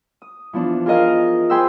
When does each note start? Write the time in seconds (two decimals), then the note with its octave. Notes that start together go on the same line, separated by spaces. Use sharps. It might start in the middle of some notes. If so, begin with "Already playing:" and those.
0.22 D#6
0.53 E3 F3 B3 D4
0.86 F4 G#4 A#4 D#5 F5
1.50 G#4 C5 G5 B5 C6 E6